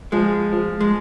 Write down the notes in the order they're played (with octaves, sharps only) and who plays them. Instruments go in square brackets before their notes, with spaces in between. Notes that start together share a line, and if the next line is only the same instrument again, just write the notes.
[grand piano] F3 [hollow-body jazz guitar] G#3
[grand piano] F3
[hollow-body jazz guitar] G#3